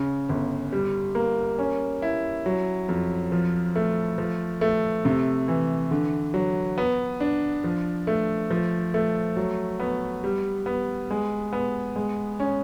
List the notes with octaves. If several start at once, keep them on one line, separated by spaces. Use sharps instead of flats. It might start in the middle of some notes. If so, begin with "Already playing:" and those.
Already playing: C#3
G1
G3
A#3
C#4
E4
F#3
F2
F3
A3
F3
A3
C3
E3
D3
F#3
B3
D4
F3
A3
F3
A3
F#3
B3
G3
B3
G#3
B3
G#3
C#4